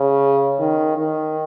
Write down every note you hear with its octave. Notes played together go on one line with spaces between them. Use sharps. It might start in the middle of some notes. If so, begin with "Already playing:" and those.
Already playing: C#3
D#3
D#3